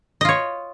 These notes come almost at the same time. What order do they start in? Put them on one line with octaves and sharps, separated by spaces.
D#5 F4 C#5